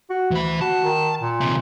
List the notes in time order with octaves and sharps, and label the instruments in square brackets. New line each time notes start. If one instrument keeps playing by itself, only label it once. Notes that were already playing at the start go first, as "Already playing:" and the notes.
[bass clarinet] F#4
[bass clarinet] D2 [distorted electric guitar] E3 B5
[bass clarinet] F#4 [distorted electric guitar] A5
[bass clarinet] D#3
A#2
[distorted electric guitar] D#2 C3